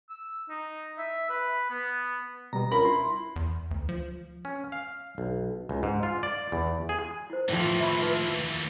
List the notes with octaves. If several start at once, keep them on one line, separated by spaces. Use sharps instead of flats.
E6
D#4
E5
B4
B3
B2 G3 B3 A#5
C#4 D4 F4 A#4 B5
E4 C6
E2
D2
F3
C#4
F5
B1
C#2
G#2
F4
D5
E2
G#4
E4 C5
D#2 A2 E3 F3
E5 B5 C#6
D#4 B4